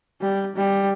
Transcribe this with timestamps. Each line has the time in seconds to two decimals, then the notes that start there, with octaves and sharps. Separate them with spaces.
0.21 G3
0.56 G3